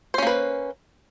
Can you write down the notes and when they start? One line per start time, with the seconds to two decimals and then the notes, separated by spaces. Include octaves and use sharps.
0.14 C5
0.18 C#4
0.23 A#3
0.27 B4